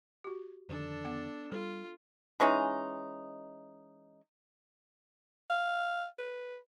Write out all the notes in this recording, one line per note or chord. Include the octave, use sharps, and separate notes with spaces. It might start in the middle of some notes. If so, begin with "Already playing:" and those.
F#4 G4
F2 D3 D#3 D4 A4
B3 F#5 D6
G3 F4 A4
E3 G#3 C#4 D#4
F5
B4